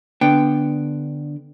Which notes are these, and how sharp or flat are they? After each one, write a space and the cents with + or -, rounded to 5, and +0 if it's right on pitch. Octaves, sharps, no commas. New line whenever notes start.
D3 +0 B3 -5 G5 +0